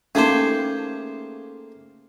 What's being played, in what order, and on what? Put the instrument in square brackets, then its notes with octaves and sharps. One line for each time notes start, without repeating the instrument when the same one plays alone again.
[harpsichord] A3 A#3 G4 [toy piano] C#4 D#4 [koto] G#4 C5